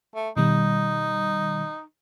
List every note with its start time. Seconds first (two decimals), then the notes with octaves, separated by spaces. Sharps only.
0.15 A3
0.37 B2 D#3 G3 D#4